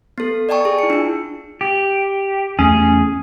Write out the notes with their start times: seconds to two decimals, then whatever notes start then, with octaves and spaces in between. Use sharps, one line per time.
0.18 B3 A4
0.49 D5 D#5 G5 A5 C#6
0.65 G#4
0.79 E4 C#7
0.90 D4 F4
1.61 G4
2.59 E2 A3 C#4 G#4